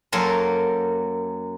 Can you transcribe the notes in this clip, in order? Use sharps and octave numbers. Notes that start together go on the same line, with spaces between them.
F#2 A#3 A4 A#4 C6